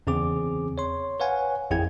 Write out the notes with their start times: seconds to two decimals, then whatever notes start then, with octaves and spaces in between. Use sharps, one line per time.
0.07 E2 C#3 C4 G#4 D6
0.78 C#5 C6
1.20 B4 C#5 F5 F#5 G#5
1.70 A1 F2 E4 G#4 G5 G#6